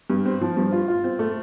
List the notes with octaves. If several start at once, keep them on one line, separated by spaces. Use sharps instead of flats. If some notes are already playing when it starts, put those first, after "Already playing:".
G2
C4
F3
G2
F4
F4
C4
A3